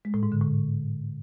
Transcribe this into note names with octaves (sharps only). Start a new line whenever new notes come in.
G#3
A2
G#2
D3
A2